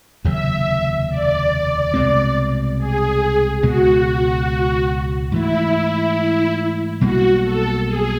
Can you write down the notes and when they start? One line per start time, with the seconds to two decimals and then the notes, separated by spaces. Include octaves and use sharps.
0.24 F1 D#2 C#3 F#3 E5
1.09 D5
1.94 C2 B2 G#3 C4
2.78 G#4
3.63 C#2 B2 G#3 F#4
5.32 G#2 E3 A3 E4
7.01 B1 B2 G3 A#3 F#4
7.43 A4
7.86 G#4